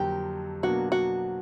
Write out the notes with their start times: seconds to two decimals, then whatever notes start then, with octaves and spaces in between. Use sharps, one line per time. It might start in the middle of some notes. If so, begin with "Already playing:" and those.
Already playing: F2 D3 F#3 A#3 G4
0.63 B2 F#3 A#3 D4 F#4
0.92 F#4